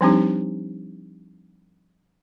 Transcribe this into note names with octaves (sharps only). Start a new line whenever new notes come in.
F3 G3 C4 D4 D#4 G4